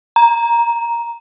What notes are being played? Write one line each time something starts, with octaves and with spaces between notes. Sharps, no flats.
A#5